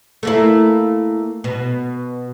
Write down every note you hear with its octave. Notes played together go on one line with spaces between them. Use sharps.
A3 A#3 E4
B2